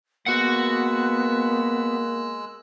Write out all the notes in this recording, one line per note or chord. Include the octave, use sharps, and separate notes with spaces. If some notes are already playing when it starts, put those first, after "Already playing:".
G#3 A#3 B3 F#4 F#5 E6 F#6